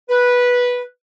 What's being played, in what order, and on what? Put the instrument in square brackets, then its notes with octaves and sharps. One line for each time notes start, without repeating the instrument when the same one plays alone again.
[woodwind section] B4